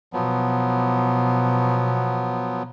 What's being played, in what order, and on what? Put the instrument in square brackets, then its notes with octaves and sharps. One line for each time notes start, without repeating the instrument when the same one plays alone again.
[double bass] B2 [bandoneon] F3 F#3 B3